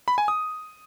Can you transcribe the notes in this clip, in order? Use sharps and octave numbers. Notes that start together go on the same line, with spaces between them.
B5
G#5
D#6